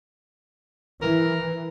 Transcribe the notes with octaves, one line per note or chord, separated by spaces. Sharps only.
E3 A#4